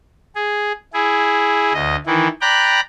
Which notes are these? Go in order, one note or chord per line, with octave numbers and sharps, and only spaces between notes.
G#4
E4 G#4
D2 D#5
D#3 E3 E4
D5 G5 A#5 B5 F#6